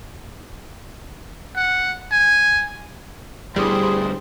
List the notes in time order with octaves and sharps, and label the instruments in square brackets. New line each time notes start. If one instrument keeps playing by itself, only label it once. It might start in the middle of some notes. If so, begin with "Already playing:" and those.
[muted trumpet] F#5
G#5
[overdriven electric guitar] D2 G2 [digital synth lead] G3 [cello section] D4 E4 C5 [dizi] G#4